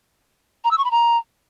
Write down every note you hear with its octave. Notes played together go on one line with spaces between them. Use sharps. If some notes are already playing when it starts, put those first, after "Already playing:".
A#5
E6
C#6
B5
A#5